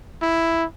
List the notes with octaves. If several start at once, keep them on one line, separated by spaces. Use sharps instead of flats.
E4